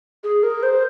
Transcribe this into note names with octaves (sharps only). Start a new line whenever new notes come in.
G#4
A#4
C5